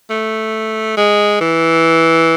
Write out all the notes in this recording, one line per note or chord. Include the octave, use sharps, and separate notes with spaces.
A3
G#3
E3